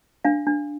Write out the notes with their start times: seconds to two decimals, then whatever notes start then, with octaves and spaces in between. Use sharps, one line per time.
0.25 D4 F5
0.47 D4